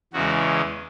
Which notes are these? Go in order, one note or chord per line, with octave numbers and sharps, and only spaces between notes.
E2 C#3 E3 G#3 F#4